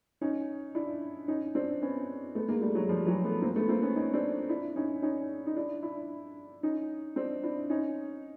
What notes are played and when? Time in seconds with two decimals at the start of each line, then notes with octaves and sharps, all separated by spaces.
0.21 C#4 D#4
0.75 D4 E4
1.28 C#4 D#4
1.55 C4 D4
1.82 B3 C#4
2.35 A3 B3
2.48 G#3 A#3
2.61 G3 A3
2.75 F#3 G#3
2.89 F3 G3
3.06 E3 F#3
3.24 A3 B3
3.42 A#3 C4
3.56 A3 B3
3.68 A#3 C4
3.82 B3 C#4
3.96 C#4 D#4
4.13 C4 D4
4.49 D4 E4
4.76 C#4 D#4
5.02 C#4 D#4
5.46 D#4
5.56 D4 E4
5.83 D4 E4
6.63 C#4 D#4
7.16 C4 D4
7.44 D4 E4
7.70 C#4 D#4